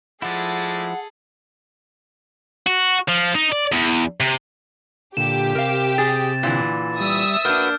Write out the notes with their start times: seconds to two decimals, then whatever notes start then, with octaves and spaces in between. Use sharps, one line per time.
0.22 F3 G#3 A3 E4 G#4 A4 D5 F#5
2.67 F#4
3.09 F3
3.36 D#4
3.53 D5
3.72 E2
4.20 C3
5.17 A#2 D3 G4 E7
5.55 C3 A#4 F5
5.98 G#4 A6
6.43 A#2 D3 E3
7.00 G3 E5 D#6 E6
7.45 A#3 D4 F#4 B4 F6 G6